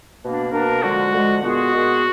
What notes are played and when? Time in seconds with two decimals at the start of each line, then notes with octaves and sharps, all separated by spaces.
0.22 B2 A#3 D4
0.52 B2 A#3 D4 A#4
0.83 D3 F3 G#3 F#4
1.13 D3 F3 G#3
1.43 A#2 G#3 B3 F4 F#4 G#4
1.74 A#2 G#3 B3 F4 G#4